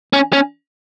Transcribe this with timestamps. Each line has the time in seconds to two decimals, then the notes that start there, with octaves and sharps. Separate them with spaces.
0.13 C#4
0.33 C#4